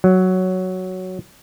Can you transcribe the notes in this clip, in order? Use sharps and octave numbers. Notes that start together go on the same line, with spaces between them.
F#3